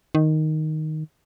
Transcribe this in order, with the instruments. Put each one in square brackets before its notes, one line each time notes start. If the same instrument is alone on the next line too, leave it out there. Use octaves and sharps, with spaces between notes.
[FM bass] D#3